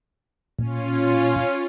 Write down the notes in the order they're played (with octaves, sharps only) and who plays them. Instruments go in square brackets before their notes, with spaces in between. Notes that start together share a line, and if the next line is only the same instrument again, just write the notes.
[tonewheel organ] A#2 [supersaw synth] C#4 F4